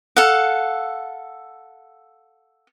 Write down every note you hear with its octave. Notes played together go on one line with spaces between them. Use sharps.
A4 F5 F#5